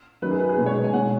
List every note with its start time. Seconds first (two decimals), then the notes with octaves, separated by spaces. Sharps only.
0.22 F#2 D#3 F#3 B4
0.31 G#4
0.40 B4
0.49 G#4
0.58 B2 G#3 B4
0.66 C#5
0.84 G#5
0.93 B2 G#3 F#5